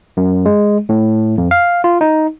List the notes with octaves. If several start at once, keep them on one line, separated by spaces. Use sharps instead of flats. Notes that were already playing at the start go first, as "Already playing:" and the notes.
F#2
G#3
A2
F2
F5
F4
D#4